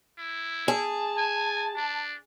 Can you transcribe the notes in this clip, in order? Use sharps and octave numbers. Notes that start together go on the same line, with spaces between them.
E4
G#4 A5
G#5
D4